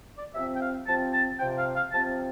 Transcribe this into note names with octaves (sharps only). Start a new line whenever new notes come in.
D5
C3 F3 C4 E5
G5
F5
C3 F3 C4 A5
A5
C3 F3 C4 G5
F5
F5
C3 F3 C4 A5